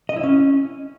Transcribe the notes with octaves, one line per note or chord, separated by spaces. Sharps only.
D#5
E4
C#4